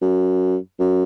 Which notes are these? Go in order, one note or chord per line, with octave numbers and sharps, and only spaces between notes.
F#2
F#2